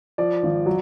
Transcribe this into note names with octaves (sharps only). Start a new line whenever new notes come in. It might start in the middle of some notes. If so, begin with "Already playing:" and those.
F3 D5
G#1
F#3